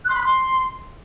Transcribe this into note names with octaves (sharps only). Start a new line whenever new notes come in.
F#6
C6
B5
F#6
C6